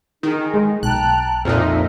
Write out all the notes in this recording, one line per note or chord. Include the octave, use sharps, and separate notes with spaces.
D#3 D#4 G#4 A#4
G#3
B1 G5 A5 A#5 F#6
F2 A#2 D#4 E4 E6 F6